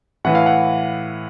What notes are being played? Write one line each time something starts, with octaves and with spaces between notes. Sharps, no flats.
A2 E3 F#5
F5
F#5